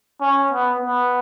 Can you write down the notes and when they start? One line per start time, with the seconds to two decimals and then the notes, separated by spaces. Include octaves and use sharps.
0.21 C#4
0.52 B3
0.83 B3